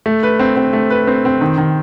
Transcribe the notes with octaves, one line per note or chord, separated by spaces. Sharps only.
A3
B4
C4
C4
A3
B4
C4
C4
D#3
D#3